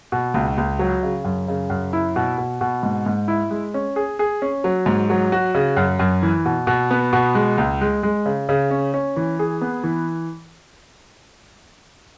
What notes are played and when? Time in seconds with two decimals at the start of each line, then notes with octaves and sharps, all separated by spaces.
0.12 B2
0.34 C#2
0.58 C#2
0.79 F#3
1.03 C#3
1.25 F#2
1.48 C#3
1.70 F#2
1.93 E4
2.16 B2
2.38 B2
2.61 B2
2.83 G#2
3.06 G#2
3.28 E4
3.51 G#3
3.74 C#4
3.96 G#4
4.19 G#4
4.42 C#4
4.64 F#3
4.86 G#2
5.10 F#3
5.32 F#4
5.55 C#3
5.77 F#2
5.99 F#2
6.22 E3
6.45 B2
6.67 B2
6.91 B3
7.13 B2
7.35 G#3
7.58 C#2
7.81 G#3
8.03 G#3
8.26 C#3
8.49 C#3
8.71 C#4
8.94 C#4
9.16 E3
9.39 G#4
9.61 B3
9.83 E3